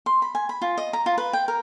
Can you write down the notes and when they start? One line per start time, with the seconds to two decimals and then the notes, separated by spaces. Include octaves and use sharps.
0.06 C6
0.22 B5
0.35 G#5
0.49 B5
0.62 F4
0.78 D#5
0.93 A#5
1.06 F4
1.18 B4
1.33 G5
1.48 A#4